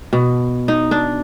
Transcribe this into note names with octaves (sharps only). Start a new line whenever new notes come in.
B2
D#4
D4